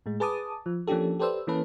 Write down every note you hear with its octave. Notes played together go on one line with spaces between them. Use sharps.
A2 G#3
G#4 B4 A5 D6 D#6
F3
F3 A#3 C#4 D4 G4 A4
G4 A4 B4 C5 D5 E6
E3 A#3 C#4 A4 B4